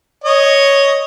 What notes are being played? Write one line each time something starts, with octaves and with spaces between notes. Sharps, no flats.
C#5 D#5